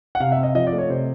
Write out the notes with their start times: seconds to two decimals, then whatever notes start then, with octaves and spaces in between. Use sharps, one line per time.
0.15 F#5
0.20 C3 F5
0.32 E5
0.37 C4
0.43 D#5
0.55 F3 D#5
0.67 D5
0.72 A3
0.78 C#5
0.90 C3 C5